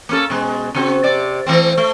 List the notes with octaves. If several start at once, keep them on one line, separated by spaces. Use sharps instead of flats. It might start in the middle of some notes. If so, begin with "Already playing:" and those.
A#3 C#4 A4
B2 G#3
C#3 C4 F#4
C3 D5
E3 A3 C4
A3